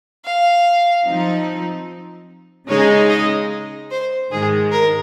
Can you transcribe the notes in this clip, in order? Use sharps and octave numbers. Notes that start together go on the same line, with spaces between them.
F5
F3 C4 D#4
C#3 G#3 D#4 G#4 C#5
D#5
C5
G#2 D#3 G#3 G#4
A#4